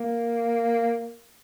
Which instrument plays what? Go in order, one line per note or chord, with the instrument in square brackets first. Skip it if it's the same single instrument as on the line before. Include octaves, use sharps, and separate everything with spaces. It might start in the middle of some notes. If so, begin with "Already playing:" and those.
Already playing: [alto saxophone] A#3